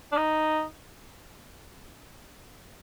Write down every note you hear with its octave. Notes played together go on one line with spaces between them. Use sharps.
D4
D#4